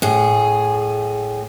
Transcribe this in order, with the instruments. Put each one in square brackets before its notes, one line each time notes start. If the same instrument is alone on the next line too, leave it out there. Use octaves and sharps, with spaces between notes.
[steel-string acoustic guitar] A2 G#4